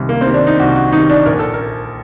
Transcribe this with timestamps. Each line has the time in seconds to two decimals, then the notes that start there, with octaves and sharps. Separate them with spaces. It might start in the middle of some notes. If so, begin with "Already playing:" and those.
Already playing: C2 C3 D#3
0.09 A#3
0.21 C4
0.27 C3 D#3
0.34 D4
0.47 D#4
0.60 C2 F#4
0.76 F#4
0.92 D#3 D#4
0.97 C3
1.10 D4
1.26 A#1 A#4
1.39 A4
1.54 A#4